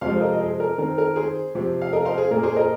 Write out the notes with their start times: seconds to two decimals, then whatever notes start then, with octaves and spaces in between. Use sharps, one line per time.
0.01 C3 F3 G#3 C5 F5
0.13 C5
0.21 A#4 D#5
0.34 D#5
0.40 G#4 C5
0.60 A#4
0.78 D#3 C4 A#4
0.98 A#4
1.16 G#4 C5
1.55 C3 F3 C4
1.81 F5
1.93 A#4 D#5
2.05 C5 F5
2.18 G#4
2.31 A#2 A#3 A#4
2.43 G#4 C5
2.56 A#4 D#5